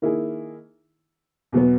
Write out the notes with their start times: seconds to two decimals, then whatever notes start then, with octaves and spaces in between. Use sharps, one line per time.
0.02 D#3 A#3 E4 G#4
1.52 E2 B2 F#3 B3